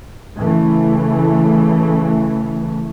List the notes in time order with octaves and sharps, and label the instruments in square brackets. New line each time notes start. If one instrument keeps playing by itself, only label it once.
[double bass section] C#3 E3 A3